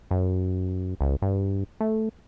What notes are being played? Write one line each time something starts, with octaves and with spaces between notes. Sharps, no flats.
F#2
C#2
G2
A3